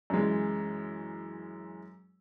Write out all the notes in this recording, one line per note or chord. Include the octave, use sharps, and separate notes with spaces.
F#2 E3 G#3